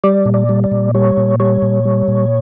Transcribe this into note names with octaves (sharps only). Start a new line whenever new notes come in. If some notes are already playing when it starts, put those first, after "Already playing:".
G3 D5
A#2
D5
G3
D5
A#2
G3 C#5
A#2
G3 C#5
A#2
G3
A#2